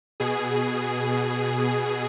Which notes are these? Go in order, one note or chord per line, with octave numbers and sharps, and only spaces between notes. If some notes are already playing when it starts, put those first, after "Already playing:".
B2 G#4